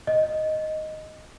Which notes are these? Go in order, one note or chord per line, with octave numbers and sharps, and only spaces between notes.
D#5